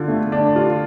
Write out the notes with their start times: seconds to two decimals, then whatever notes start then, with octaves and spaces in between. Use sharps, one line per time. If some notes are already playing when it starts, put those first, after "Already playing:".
Already playing: D3 F4
0.08 A3
0.32 D4
0.56 F4